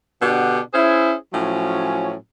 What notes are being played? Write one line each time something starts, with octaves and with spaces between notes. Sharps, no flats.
B2 D3 D4 G4 F#5
C#4 E4 G#4 C5 E5
A2 F3 F#3 C#4